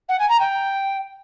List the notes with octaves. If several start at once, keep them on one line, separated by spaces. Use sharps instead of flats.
F#5
G#5
A#5
G5